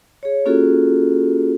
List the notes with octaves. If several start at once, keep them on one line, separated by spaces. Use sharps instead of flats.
G#4 C#5
A#3 C#4 F4 F#4 G#4 A4